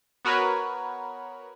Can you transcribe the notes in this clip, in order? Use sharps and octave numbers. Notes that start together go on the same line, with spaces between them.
B3 F#4 A#4 B4 C#5